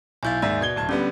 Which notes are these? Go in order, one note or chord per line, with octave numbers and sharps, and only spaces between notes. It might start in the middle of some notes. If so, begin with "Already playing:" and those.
B1 E4 F5 G#5 G6 A6
D#2 G#2 D5 E5
B2 G#6 G7
D1 A5 G#6
D3 G3 B3 C#4